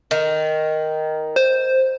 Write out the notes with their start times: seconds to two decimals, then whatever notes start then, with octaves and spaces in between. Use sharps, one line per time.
0.11 D#3
1.36 C5